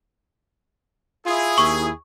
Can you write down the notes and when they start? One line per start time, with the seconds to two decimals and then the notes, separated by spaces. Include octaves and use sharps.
1.26 E4 F4 G#4 D#6
1.58 D#2 C#6